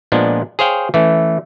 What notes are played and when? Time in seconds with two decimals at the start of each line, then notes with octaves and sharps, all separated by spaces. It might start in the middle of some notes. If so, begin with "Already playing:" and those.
0.12 A#2 F3 G#3 B3 D4
0.59 G#4 C5 C#5 F5 G5
0.94 E3 A3 C#4